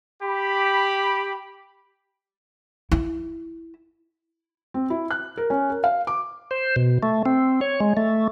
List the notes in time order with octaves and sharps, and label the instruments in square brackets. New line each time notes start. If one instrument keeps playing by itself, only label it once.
[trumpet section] G4 B5
[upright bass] E4
[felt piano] C4
E4
F#6
A#4
C#4
A#4
F5
D6
[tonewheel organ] C5
B2
A3
C4
C#5
G#3
A3